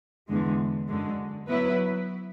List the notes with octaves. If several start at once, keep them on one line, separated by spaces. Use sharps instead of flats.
E2 D3 G#3
F#2 D3 G#3
F#3 B3 E4 B4